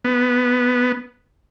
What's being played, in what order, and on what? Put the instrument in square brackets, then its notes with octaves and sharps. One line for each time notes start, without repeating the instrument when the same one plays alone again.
[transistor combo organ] B3